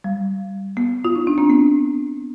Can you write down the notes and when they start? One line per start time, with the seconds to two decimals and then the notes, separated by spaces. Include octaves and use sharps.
0.04 G3
0.77 B3
1.05 F4
1.15 D#4
1.27 D4
1.38 C4
1.50 B3